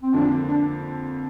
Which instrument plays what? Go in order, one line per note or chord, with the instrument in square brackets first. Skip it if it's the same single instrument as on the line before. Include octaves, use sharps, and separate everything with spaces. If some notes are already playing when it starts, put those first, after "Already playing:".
[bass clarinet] C4
[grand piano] F2 D3 F3 A#3 [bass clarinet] D4
[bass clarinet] D4